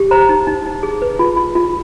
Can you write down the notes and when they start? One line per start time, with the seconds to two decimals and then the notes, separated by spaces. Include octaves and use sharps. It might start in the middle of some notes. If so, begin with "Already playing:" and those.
Already playing: G4
0.11 C5 A#5
0.29 D#4
0.47 D#4
0.66 D#4
0.83 G#4
1.02 B4
1.19 F4
1.37 F4
1.55 F4